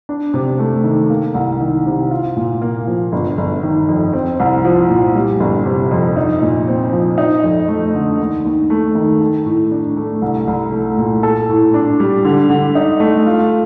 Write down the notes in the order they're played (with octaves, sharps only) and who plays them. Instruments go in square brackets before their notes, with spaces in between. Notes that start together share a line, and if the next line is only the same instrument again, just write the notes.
[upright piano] D4
C3
A3
D#3
A#3
C2
D#3
C3
F4
A#2
A#3
F3
G1
G1
D#3
F2
C4
C2
F3
A#2
G3
G1
C3
F2
D#4
A#2
C4
F3
D#4
F2
A3
D3
D#2
D#2
A3
D#3
A4
A2
D4
A3
C2
C2
A3
A#2
A4
A2
D4
G3
D3
D3
D#4
A3
F4